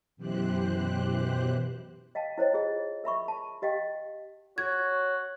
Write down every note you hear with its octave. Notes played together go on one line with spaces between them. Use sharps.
F#2 B2 E3 G4 C5 F#6
D#5 F5 G5 A5
E4 C5 C#5 D#5 G5
F4 G#4 D#5
A#4 E5 B5 C#6
A5
G4 D#5 F5 G5
F#4 C#5 G#6